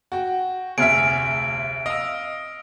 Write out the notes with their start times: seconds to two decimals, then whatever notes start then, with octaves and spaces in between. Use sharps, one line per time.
0.12 F#4 G5
0.78 F1 D2 G#4 E5 F6 D7
1.86 D#5 F5 D#6 E6